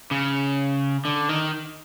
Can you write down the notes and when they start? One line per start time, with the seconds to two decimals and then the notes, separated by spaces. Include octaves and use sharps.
0.11 C#3
1.05 D3
1.29 D#3